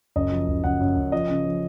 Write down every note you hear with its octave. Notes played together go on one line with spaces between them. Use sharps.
F#1 D#5
F3
F#1
F#1 F#5
F#2
F#1
F3 D#5
C#3
F3